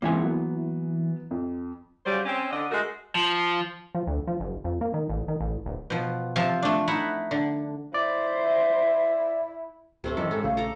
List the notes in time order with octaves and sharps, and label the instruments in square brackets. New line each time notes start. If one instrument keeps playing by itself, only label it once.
[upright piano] C#2 C#3 C4 [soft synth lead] E3 [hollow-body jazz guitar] A#3 E4 G#5
[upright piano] F#3 B3
F2
[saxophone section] C#3 F#3 G3 C5
C4 C#4
D3 D#5
G#3 A3 F#4 A#4
[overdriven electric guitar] F3
[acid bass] F3
D2
F3
F#1
F2
A#3
D#3
A1
D#3
A1
D1
[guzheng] B2 F3
C3 F3 F4 A5
A3 D4
D#4 E4 E5 F#5
D3
[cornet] E4 [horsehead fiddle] C5 [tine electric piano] D5 [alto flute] E5
[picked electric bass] D1 [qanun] C3 A3 C4
[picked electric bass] F#2 E3 [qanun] G4 A4 [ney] D#5
[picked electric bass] G#2 [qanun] C#4 [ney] A4
[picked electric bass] A#1 C#3 A3 [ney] F5
[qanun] A4 A#5 D6